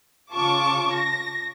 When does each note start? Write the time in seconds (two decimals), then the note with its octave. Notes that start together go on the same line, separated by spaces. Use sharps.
0.33 C#3 F4 A5 C#6 D6
0.94 A#6